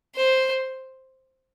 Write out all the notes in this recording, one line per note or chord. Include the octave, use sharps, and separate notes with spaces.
C5